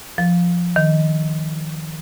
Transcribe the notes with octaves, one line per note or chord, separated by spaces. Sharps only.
F3
D#3